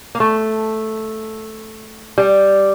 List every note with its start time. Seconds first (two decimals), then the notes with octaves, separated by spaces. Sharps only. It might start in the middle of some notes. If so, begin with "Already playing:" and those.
0.15 A#3
0.20 A3
2.18 G3